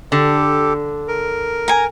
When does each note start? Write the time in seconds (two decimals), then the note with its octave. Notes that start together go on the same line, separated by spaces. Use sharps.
0.12 D3 G4 A4
1.08 A#4
1.68 G#5 A#5